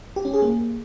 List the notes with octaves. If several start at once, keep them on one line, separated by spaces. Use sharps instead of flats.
G4
C#4
G#4
A#3